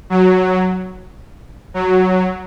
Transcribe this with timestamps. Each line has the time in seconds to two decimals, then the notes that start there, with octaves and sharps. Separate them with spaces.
0.10 F#3
1.74 F#3